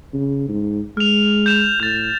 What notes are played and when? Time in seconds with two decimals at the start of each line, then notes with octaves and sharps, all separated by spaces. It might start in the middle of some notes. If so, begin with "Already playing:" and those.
0.14 C#3
0.49 G#2
0.97 G#3 F6 F7
1.46 G6 E7 F7
1.80 A2 G6 A6